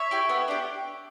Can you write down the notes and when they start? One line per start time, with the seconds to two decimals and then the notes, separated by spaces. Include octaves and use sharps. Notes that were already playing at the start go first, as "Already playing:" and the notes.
Already playing: C#5 E5
0.11 E4 G4
0.29 B3
0.48 D4 G4